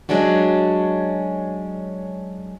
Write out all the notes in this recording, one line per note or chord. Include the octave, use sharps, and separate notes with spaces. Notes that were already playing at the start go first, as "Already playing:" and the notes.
F#3 G#3 C#4 D4 F#4